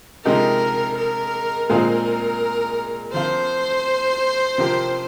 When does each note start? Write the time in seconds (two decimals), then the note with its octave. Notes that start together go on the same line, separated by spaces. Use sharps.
0.25 C3 F3 G#3 D#4 G4 A#4
0.98 A#4
1.69 A#2 G#3 C4 F4 G#4 A#4
3.13 F3 C4 F4 C5
4.58 C3 F3 C4 G4 A#4